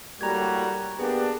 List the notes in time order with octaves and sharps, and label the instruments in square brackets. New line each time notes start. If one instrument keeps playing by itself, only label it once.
[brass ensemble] A2 A#3 F#4 [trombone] G3 [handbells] A#5 G#6
[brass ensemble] A#3 B3 D4 [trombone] G4 [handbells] G#4